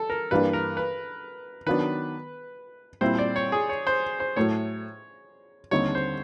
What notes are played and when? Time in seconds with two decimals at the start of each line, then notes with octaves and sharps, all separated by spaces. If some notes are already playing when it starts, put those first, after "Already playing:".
Already playing: A4
0.10 A#4
0.31 G2 E3 G3 A#3 D4 B4
0.53 A#4
0.77 B4
1.66 D#3 F#3 B3 D4 B4
3.01 A#2 G3 C4 E4 C5
3.18 D5
3.36 C#5
3.52 G#4
3.69 C#5
3.87 C5
4.20 C5
4.36 A2 F#3 A3 C#5
5.71 D#2 D3 G3 C4 D#4 C#5
5.95 C5